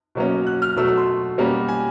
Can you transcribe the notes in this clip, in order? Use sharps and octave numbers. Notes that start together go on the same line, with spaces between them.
B2 F#3 A#3 C#4
F#6
F6
B2 F#3 A3 E6
E6
C6
B2 G3 A#3 C#4
G#5